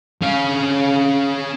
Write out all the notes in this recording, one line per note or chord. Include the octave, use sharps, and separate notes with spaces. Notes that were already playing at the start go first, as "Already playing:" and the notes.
C#4 F5